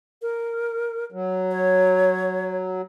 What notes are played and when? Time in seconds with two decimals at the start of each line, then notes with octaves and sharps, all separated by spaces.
0.22 A#4
1.12 F#3
1.51 C#5